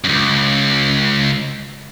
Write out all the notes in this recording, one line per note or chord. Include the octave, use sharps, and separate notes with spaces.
C#2 F#2